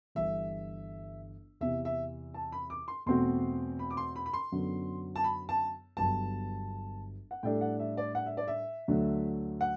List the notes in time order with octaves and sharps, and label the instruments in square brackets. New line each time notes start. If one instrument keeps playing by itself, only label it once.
[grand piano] G1 G2 E3 [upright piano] E5
[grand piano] E2 C3 E3 [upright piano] E5
[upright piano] E5
A5
B5
D6
C6
[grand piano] E2 B2 A3 C4 F#4 [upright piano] C6
[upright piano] B5
D6
C6
B5
B5
C6
[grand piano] F#2 D3 F#3 B3
[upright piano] A5
B5
A5
[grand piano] G1 G2 F#3 B3 [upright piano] A5
[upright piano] F#5
[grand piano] A2 G3 D4 A4 [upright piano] G5
[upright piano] F#5
E5
D5
F#5
E5
D5
E5
[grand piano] D2 D3 F#3 A3
[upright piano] F#5